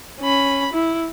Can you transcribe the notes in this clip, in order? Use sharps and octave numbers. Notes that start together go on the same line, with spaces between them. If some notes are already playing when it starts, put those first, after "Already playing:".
C#4 B5
E4